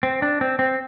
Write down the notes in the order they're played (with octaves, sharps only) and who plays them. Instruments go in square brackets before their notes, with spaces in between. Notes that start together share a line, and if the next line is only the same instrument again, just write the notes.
[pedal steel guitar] C4
D4
C4
C4